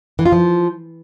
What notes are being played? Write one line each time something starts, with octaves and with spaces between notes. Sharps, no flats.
E3
F4
F3